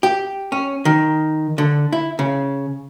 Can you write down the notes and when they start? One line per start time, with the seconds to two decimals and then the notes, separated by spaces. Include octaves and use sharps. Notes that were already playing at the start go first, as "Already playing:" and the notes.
0.03 G4
0.52 C#4
0.85 D#3
1.58 D3
1.93 E4
2.19 C#3